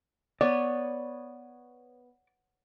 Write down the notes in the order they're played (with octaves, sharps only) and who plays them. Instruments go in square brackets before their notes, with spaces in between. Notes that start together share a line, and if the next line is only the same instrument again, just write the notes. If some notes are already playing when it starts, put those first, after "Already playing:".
[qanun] B3 C#5 [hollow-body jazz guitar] D5